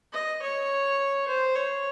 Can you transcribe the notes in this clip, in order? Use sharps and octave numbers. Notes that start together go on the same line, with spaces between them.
D#5
C#5
C5
C#5